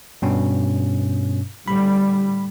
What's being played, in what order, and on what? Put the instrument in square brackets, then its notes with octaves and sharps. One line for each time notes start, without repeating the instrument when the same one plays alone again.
[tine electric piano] G2 B2 C#4
[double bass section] A2 D3 G3 [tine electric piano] B5